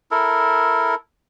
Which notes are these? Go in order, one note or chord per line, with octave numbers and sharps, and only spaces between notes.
E4 A4 A#4